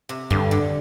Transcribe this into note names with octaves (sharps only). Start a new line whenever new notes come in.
C3
G2 D3
D3